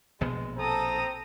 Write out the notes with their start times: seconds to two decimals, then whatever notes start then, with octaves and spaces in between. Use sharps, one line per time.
0.21 A#1 B2 G#3 B3
0.57 C4 A4 A#5 D#6